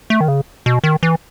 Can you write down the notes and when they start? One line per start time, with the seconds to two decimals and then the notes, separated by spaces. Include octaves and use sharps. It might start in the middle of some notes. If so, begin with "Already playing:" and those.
0.10 A3
0.21 D#3
0.28 C#3
0.66 B2
0.84 D#3
1.03 E3